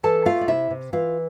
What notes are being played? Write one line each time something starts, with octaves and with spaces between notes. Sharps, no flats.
E3 A4 A5
A3 F4 F5
D5
C3 E4 E5
C3
E3 F4 F5